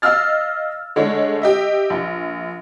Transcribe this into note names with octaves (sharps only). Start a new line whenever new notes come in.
D#5 F5 E6 F6 A6
D3 G#3 A3 D4 C#5
G4 D#5 E5
A#1